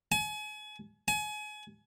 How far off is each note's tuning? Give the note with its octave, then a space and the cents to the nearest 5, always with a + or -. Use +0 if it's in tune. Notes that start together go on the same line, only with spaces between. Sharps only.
G#5 +35
G#5 +30